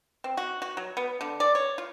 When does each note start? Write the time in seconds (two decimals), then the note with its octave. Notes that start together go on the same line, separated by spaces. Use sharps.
0.24 C4
0.37 F#4
0.62 F#4
0.77 F#3
0.97 B3
1.21 D3
1.40 D5
1.55 C#5
1.78 F4